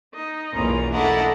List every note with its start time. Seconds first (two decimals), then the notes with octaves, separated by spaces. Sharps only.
0.14 D#4 D#5
0.55 B1 E2 A#3 C#4 F4 A#5
0.94 A3 D4 E4 A4 D#5 F#5 A#5